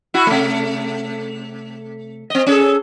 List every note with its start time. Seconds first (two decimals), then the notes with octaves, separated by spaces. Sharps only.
0.14 E4 F#4
0.27 C3 A3
2.30 C4 D#5
2.47 C#4 G#4 A4